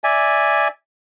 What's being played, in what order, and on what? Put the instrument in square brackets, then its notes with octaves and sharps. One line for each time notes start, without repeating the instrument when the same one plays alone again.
[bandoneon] D5 E5 G#5